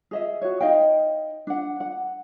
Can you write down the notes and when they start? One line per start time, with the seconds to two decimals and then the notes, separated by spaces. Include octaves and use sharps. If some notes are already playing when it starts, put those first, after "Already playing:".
0.11 G#4 D#5 E5
0.42 F#4 C#5
0.60 D#4 D#5 F5 G5
1.47 D4 F#5
1.80 F#5